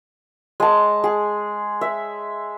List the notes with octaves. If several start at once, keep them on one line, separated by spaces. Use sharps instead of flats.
G#3 A5
G#4
E5